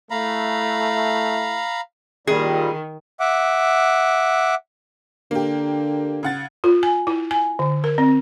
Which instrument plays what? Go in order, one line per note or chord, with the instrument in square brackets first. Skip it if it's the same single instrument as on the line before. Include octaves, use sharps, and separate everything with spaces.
[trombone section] A3 E4 [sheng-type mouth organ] F5 A#5 B5
[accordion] A#2 G3 [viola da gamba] D#3 [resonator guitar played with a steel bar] G#4
[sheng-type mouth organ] E5 F#5 D6
[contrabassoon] D3 [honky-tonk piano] A#3 G4
[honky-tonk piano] C#3 F#5 A6
[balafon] F4
G#5
E4
G#5
D3
A#4
C4